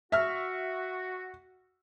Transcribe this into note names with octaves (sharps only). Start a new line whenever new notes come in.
F#4 E5 F6